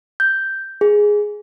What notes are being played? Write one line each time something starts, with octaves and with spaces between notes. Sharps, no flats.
G6
G#4